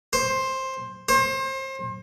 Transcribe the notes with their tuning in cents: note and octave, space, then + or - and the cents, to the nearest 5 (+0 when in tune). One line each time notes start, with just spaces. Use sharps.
C5 +10
C5 +30